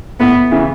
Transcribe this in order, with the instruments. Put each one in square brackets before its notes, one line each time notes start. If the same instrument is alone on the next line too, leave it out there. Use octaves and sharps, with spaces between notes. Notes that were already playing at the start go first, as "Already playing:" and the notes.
[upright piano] A2 [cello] B3
[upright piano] C#3 E3